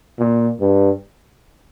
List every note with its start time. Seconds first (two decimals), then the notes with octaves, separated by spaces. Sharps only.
0.19 A#2
0.61 G2